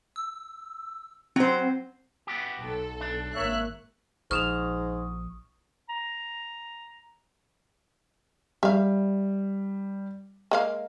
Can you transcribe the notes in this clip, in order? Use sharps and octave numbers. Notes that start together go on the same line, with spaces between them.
E6
F#3 C4 C5
B3 F#4 G4
B1 A4
D4
G#1 A#3 C#5 E5 F#6
A#1 G#2 F3 C#6 D#6 F6 E7 F7
A#5
G3 E5 F5
G#3 A#3 F5